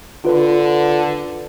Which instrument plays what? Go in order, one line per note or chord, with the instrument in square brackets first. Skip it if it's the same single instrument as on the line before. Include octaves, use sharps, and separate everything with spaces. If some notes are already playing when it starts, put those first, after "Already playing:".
[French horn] D3 [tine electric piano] F4 B4